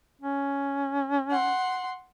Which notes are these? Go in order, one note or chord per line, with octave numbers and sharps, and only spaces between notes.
C#4
F#5 C6